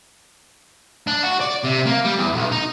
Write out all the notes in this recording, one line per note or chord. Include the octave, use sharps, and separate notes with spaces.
D4
F#4
D5
C3
A#3
G3
E2
B1
D#4